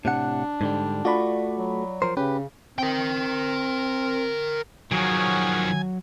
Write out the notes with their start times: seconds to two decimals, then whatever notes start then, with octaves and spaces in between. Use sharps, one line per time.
0.05 A2 C3 D4 F#5
0.61 G#2 D3 G3
1.05 A3 F4 F#4 D5 B5
1.58 F#3
2.02 F3 A#4 C5
2.17 C#3 C#4 G4 B4
2.79 C4 A#4 G5
4.92 D#3 F3 F#3 C#4 F#4 G#4 G#5